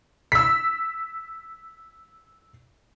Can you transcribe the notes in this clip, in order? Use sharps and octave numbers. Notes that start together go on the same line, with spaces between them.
E6 B6